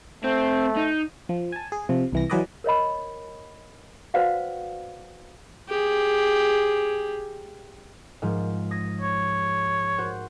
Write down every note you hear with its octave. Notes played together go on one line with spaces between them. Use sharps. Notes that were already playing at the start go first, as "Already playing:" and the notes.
A3 C4
D#4
F3
G#5 A5
G#4
C3 F3
C2 E3 A#6
E3 F#3 G#4 B4 D5 D#5
A#4 C#5 D#5 B5
F#4 B4 C5 D5 F5 F#5
G4 G#4
G#2 F3
D#6 G#6 A#6
C#5
F#4 C5